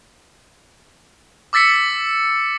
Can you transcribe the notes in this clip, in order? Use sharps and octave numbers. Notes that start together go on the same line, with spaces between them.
D6 E6 A6 B6 C#7